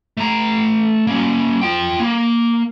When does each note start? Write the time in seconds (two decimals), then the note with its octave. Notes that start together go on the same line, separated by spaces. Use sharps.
0.17 A3 A#5
1.07 A#3 C#4
1.61 F4 G5
2.00 A#3